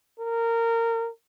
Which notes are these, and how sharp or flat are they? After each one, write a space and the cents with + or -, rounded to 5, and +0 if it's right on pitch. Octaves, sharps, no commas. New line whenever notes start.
A#4 -20